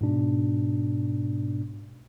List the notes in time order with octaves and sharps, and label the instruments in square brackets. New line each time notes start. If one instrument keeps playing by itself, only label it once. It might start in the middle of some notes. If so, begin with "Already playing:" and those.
[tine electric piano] G#2 B2 D4